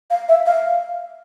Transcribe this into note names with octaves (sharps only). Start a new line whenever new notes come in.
F5
E5
F5